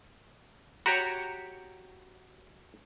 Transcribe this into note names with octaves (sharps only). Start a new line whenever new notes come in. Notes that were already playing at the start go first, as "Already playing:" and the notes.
F#4 G4 C#5 A#5